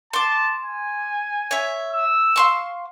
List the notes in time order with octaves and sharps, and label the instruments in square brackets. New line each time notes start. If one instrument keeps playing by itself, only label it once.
[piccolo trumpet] A5 [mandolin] C6 D6
[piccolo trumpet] G#5
[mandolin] C#5 E5
[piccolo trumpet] E6
[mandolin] F5 C6 C#6